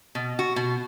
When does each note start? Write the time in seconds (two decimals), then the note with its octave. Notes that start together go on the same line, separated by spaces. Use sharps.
0.15 B2
0.39 F#4
0.56 B2